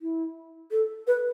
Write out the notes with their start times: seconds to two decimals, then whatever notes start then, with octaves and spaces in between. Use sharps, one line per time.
0.02 E4
0.71 A4
1.07 B4